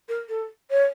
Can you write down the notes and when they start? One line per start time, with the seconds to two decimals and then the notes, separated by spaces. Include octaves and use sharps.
0.08 A#4
0.29 A4
0.70 C#5